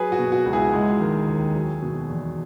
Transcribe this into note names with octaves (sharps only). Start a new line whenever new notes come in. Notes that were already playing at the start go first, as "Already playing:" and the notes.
Already playing: F#3 G#4 B4
F#4
B2
F#4
C#2
E4 G#4
G#3
D#3
D#2
F#3
B2
E2